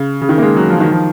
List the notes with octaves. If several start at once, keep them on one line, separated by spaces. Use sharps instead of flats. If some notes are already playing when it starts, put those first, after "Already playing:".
Already playing: C#3
C#3
D#3
A#3
G#3
F#3
F3
D#3
F3